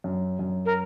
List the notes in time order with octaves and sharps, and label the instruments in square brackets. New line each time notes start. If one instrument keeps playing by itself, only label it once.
[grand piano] F#2
F#2
[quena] A#4